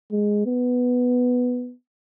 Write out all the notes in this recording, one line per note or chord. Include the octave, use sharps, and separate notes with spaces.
G#3
B3